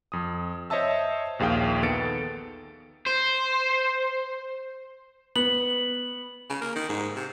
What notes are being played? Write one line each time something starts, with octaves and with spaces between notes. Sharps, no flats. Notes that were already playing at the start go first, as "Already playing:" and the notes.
F2 D#6
C5 C#5 D#5 E5 A5 E6
A#1 D#2 G#4 F5 G5
D#3 B3 A4 A6 C#7 D7
C5
B3 F#7
C#3
A#3
D#3
G#2
C3